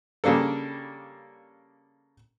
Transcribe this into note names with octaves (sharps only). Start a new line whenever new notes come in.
C#3 G3 A#3 D4 A4